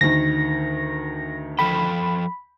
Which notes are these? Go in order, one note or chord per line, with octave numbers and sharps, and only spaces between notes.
D2 D#3 A#6
F3 A4 G5 B5